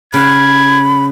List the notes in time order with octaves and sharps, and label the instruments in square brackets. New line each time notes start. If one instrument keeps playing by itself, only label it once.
[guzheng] C#3 F#5 [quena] B5 [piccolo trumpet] G#6